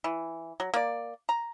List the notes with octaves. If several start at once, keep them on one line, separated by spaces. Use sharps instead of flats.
E3
F#3
A#3 D5
A#5